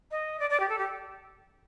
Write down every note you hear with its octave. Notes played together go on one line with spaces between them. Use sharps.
D#5
D5
D5
G4
A4
G4